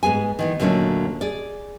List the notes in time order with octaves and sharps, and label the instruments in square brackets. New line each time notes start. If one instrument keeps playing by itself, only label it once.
[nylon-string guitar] G#2 B3 G#4 G#5
D#3 E3 B3
D#2 A#2 D3 F#3 A3 C#4
G#4 D5